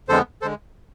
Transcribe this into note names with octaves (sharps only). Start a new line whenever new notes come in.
F2 D3 G#3 B3 A4 C5
D3 G#3 A4 C5